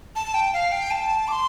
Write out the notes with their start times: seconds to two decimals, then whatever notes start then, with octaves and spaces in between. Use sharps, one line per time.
0.16 A5
0.34 G5
0.53 F5
0.72 G5
0.91 A5
1.28 D6
1.32 C6